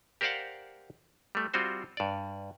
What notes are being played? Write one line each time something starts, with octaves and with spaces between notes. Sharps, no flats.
G4 A#4 C5 D5 F5 F#5
G3 A3
G3 C4 F4 F#4 C5
G2 D5